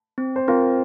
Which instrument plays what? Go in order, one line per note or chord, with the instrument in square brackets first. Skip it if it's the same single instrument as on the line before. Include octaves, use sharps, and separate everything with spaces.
[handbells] C4
[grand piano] C5
[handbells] C4 [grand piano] F4 A#4